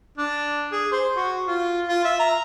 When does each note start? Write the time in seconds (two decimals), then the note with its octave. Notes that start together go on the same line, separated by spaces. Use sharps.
0.17 D4
0.72 G#4
0.92 C5
1.16 F#4
1.47 F4
1.88 F4
2.04 E5
2.19 A#5